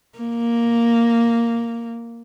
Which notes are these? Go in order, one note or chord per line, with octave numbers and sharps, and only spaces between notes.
A#3